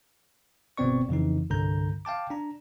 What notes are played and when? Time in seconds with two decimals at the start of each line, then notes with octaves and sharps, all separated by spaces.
0.77 G1 B2 B3 C4 D5 C#6
1.09 F2 C#3 E3 D#4
1.50 C2 G2 D3 A#5 G6
2.05 F5 G5 A5 D6
2.30 D4 A#5